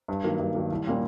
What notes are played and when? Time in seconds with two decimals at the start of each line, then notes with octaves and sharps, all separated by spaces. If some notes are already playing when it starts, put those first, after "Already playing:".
0.08 G2
0.24 D#3 F#3 A#3
0.39 G2
0.55 D#3 F#3 A#3
0.71 C2
0.87 A#2 G3 A#3 C#4